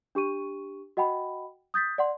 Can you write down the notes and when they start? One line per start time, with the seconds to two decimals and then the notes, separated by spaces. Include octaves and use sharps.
0.15 D4 G4 C#6 D#7
0.97 F#4 D#5 F#5 G5 B5
1.74 D#6 G6 A6 B6
1.98 D5 F#5 C6